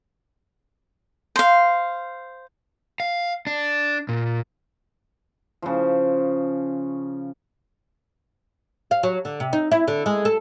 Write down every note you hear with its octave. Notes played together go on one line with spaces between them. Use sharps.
C5 F5
F5
D4
A#2
C#3 F3
F5
F#3
D3
C3
D#4
E4
D3
G#3
A4